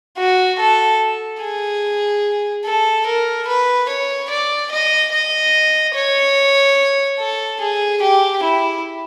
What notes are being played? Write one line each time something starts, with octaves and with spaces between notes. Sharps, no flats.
F#4
A4
G#4
A4
A#4
B4
C#5
D5
D#5
D#5
C#5
A4
G#4
G4
E4